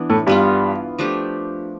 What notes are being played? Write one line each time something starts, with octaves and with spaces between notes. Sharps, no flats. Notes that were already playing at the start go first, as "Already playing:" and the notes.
Already playing: E3 B3 D4
A2 A3
G2 E3 G3 B3 F4
F3 A3 D4 G4